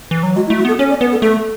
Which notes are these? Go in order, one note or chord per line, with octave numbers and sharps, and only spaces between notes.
E3
F#3
G#3 F#4
E4
A3
F#4
B3 A4
C#4 C#5
D5
B3 B4
A4
A3 A4